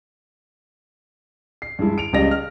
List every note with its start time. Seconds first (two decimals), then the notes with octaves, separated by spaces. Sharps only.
1.62 C7
1.79 G2 G#3 E4
1.98 D7 F7
2.13 C#2 G3 D#5 A#6 F7
2.31 F6